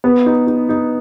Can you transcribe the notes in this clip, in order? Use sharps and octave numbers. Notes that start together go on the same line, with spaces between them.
B3
D#4
D#4
D#4